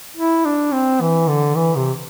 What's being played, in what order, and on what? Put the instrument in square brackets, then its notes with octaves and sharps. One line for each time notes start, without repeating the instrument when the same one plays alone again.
[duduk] E4
D4
C4
E3
D3
E3
C3